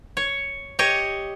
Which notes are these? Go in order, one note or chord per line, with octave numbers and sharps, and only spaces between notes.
C#5
G4 C#5 D#5